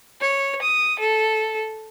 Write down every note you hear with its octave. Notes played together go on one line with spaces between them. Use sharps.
C#5
D#6
A4